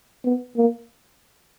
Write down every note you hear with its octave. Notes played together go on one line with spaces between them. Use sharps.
B3
A#3